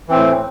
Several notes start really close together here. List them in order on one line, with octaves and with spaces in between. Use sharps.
E3 C4 A2